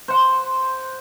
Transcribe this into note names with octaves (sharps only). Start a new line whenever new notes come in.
C5 F#5